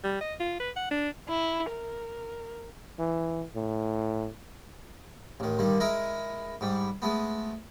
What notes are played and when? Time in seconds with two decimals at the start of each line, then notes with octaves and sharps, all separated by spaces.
0.04 G3
0.21 D#5
0.40 F4
0.60 B4
0.76 F#5
0.91 D4
1.29 E4
1.71 A#4
2.99 E3
3.56 A2
5.40 A1 D#3
5.59 G2 D3 D#3
5.80 G#3 E4 A#4 D#5
6.61 G#2 G3
7.02 G#3 A3 B3